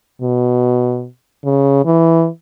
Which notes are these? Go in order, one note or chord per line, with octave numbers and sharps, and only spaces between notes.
B2
C#3
E3